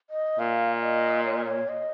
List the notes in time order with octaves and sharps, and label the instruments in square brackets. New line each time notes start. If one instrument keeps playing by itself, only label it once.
[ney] D#5
[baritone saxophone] A#2 [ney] F5
[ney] D#5
C#5
D#5
C#5
D#5